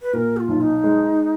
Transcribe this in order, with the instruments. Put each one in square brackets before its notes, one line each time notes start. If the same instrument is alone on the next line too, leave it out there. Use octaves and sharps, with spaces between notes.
[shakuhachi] B4
[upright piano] A#2 [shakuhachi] A#4
[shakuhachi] F#4
F4
[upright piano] B1
[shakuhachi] D#4
[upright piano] G#3